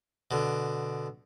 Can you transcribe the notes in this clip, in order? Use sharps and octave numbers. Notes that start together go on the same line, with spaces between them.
B2 D3